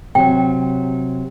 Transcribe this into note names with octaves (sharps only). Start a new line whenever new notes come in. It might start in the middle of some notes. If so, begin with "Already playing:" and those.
C3 F#3 G5